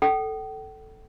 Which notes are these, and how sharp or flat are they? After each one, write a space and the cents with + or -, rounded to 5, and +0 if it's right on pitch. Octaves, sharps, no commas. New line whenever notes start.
A4 +0 G5 -40